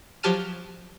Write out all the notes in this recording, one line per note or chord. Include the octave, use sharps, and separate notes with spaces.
F3 F#3 G4 A5 F6 D#7